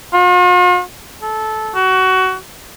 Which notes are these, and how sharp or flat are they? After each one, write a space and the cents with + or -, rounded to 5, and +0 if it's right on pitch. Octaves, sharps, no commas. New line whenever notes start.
F4 +45
A4 -15
F#4 +20